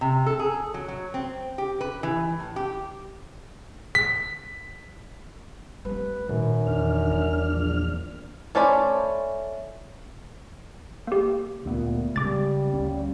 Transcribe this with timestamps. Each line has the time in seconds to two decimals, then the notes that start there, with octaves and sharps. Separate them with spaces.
0.01 C3
0.26 A4
0.39 G#4
0.74 F#3
0.88 F#3
1.14 C4
1.58 G4
1.81 B4
2.03 E3
2.40 A2
2.56 G4
3.95 B6
5.85 G3 A3 C4 B4
6.29 F#2 A#2 D#3
6.67 E2 D4 F6
7.11 G3
7.51 A#1
8.55 A3 C#4 C5 D5 B5
11.07 A#3 G4
11.65 D2 A#2 A3 B3
12.16 C#3 G3 G#3 D6 A6
12.74 D2 A#3 C#4